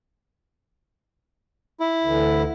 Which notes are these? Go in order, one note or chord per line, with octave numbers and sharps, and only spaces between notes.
E4
D2 D3 E3